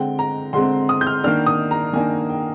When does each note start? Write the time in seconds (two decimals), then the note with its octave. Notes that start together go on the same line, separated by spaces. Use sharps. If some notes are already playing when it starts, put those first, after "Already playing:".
Already playing: D3 G#3 C4 G5
0.19 A#5
0.53 D3 G#3 C4 C6
0.89 D#6
1.01 G6
1.07 F6
1.24 D#3 A#3 D4 F6
1.47 D#6
1.71 A#5
1.93 D#3 A#3 D4 G#5
2.29 G5